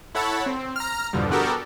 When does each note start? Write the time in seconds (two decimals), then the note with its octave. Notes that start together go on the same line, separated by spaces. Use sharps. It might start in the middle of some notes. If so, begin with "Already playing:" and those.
0.15 E4 A4 C#5 F#5 A5 B5
0.46 C4
0.76 A#5 F6
1.13 E2 G2 B2 D3 F3 G3
1.31 B3 D4 F#4 G4 A4 A#4